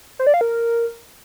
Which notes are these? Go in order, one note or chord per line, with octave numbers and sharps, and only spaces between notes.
C5
D5
F5
A#4